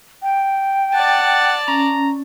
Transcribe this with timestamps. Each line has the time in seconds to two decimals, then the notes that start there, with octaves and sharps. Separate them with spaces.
0.23 G5
0.94 D5 F#5 A5
1.68 C#4 A#5